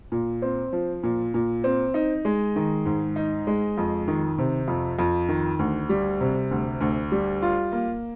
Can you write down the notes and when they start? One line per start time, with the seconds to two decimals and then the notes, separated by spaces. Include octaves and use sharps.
0.12 A#2
0.42 C4
0.73 F3
1.03 A#2
1.34 A#2
1.64 C4
1.94 D#4
2.25 G#3
2.56 D#3
2.85 G#2
3.16 D#4
3.47 G#3
3.78 F2
4.08 D#3
4.38 C3
4.68 F2
4.99 F2
5.29 D#3
5.59 D2
5.89 G3
6.21 C3
6.51 D2
6.81 D2
7.12 G3
7.42 F4
7.72 A#3